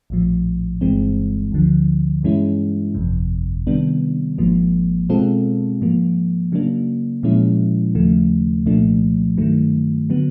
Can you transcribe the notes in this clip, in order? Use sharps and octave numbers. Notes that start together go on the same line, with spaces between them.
A#1 A2 F3
G1 G2 E3 G#3 C4
D2 D3 F3
G2 E3 G#3 C#4 E4
G1 F2 C3
C3 D#3 G3 B3 D4
G#1 G#2 F3 A#3
B2 G#3 C4 F4 A4
G#2 F3 A#3
C#3 F#3 A#3 D4
A#2 F3 G#3 C#4 E4
D#2 C#3 F3 A3
C2 A#2 F3 A3 D4
G2 D#3 F#3 A3
D3 F#3 B3